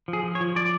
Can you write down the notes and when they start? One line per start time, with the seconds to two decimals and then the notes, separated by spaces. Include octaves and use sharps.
0.08 F3
0.13 G#4
0.23 F3
0.35 C#5
0.41 F3
0.56 F3 D5